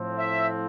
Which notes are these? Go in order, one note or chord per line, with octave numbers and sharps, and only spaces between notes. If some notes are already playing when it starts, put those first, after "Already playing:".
Already playing: A2 F3 C4
E5